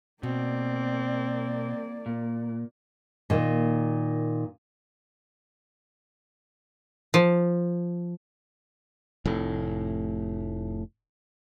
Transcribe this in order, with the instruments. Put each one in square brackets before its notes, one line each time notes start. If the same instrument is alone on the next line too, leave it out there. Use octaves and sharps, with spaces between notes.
[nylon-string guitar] B2 [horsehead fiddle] A#3 D5 [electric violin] C4
[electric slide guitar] A#2
[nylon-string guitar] A#2 D#3 A#3
[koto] F3
[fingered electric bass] F1 A2